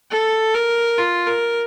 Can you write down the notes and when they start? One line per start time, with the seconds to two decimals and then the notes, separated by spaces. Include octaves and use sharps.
0.11 A4
0.55 A#4
0.98 F4
1.27 A#4